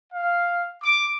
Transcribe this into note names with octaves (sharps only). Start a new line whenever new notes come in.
F5
D6